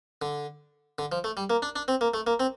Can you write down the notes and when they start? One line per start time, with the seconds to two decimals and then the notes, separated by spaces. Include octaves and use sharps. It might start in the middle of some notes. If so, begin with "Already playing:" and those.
0.22 D3
0.99 D3
1.12 F3
1.24 A3
1.37 G3
1.50 A#3
1.62 D4
1.76 D4
1.88 C4
2.01 A#3
2.14 A3
2.27 A#3
2.40 C4